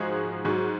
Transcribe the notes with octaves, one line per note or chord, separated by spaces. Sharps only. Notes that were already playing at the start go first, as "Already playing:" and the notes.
Already playing: G#2 F3 G#3 F#4 G#4
G#2 F#3 F#4